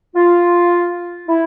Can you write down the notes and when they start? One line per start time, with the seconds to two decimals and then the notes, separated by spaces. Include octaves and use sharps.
0.16 F4
1.29 E4